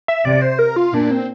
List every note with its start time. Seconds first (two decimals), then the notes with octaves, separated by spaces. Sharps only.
0.08 E5
0.25 C3 D5
0.42 C5
0.59 A#4
0.76 F4
0.93 A#2 D4
1.11 C4